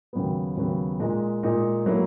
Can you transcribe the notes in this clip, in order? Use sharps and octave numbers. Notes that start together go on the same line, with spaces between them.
D#2 C#3 F#3 B3
D#2 C#3 F#3 B3
A#2 G#3 D#4
A#2 G#3 D#4
F#3 A#3 E4